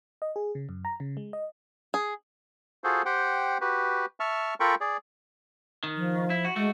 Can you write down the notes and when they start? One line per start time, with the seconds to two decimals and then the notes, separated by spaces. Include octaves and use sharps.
0.22 D#5
0.36 G#4
0.55 C#3
0.69 F#2
0.85 A#5
1.00 C#3
1.17 G#3
1.33 D#5
1.94 G#4
2.84 F4 F#4 G#4 A4 C5
3.06 G4 C5 F#5 G5
3.61 F#4 G4 B4
4.20 E5 A5 C#6 F6
4.60 F4 A4 A#4 G5 B5 C#6
4.81 G#4 D5
5.84 D#3
5.97 F3
6.30 E4
6.45 F#4
6.56 G#3 A3 F#4